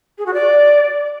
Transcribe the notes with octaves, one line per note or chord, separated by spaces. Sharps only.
G#4
F#4
D5